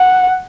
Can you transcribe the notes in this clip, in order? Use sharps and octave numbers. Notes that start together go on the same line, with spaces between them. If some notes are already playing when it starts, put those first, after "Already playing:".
Already playing: F#5